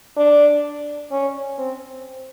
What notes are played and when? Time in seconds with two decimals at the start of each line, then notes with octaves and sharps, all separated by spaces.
0.17 D4
1.11 C#4
1.58 C4